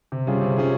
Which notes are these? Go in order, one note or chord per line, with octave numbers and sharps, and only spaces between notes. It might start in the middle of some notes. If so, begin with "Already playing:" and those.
C3
G3 C#4 F4 G#4
C3
G3 C#4 F4 G#4